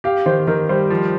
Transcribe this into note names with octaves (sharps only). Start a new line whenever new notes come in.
G4 F5
D#3 C5
D#3 A#4
G3 C5
F3